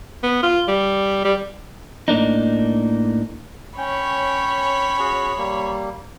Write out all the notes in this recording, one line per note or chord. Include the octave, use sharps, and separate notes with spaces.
B3
F4
G3
G3
A2 A#3 D4 D#4
C#4 C#5 G5 B5
C#4 F#4 G#4
G3 A#3